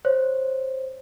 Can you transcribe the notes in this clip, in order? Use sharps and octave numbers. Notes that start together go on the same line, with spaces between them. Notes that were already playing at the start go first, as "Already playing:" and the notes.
C5 C#5